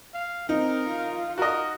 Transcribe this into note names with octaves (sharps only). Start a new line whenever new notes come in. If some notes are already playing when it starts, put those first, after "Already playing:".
F5
C4 D#4 A#4
F4
F#4 A#4 D#5